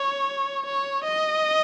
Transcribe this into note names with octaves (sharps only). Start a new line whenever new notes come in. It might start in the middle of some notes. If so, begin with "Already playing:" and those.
Already playing: C#5
C#5
D#5